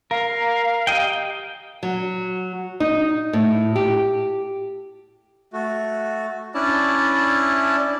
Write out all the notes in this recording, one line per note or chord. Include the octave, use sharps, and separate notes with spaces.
A#4 F5
G4 D#5 G5
F#3
D#4
A2
G4
A3 F#4
C#4 D4 E4 D5 A5